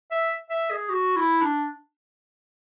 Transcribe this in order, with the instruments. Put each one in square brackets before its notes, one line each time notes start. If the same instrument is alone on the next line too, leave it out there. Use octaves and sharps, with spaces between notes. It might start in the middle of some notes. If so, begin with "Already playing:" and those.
[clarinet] E5
E5
G#4
F#4
E4
D4